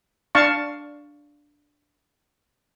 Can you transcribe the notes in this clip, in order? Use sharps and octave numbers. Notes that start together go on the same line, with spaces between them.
D4 F5 A5 C#6